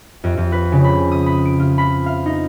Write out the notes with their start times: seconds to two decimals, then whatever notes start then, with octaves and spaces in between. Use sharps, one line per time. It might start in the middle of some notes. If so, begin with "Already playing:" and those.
0.24 F2
0.37 F2
0.52 B4
0.72 C#3
0.84 B5
1.12 D#6
1.26 B5
1.45 D7
1.60 F4
1.78 B5
2.06 F5
2.26 D#4